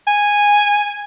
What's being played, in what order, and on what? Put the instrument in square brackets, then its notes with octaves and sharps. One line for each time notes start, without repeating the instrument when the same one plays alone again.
[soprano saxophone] G#5